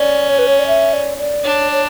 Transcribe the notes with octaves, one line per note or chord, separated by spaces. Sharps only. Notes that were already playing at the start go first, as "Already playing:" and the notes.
Already playing: C#4 D5
C#5
B4
C#5
D5
E5
D5
D5
D4 C#5
C#5